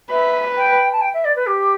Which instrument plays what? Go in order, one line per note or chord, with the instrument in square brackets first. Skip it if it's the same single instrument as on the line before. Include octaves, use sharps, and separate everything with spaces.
[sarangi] B4 [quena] E5
[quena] G5
A5
G5
E5
D5
B4
G4